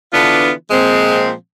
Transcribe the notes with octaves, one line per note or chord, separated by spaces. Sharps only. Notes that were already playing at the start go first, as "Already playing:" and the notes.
D3 E3 B3 D4 F4
A#2 F3 G#3 C4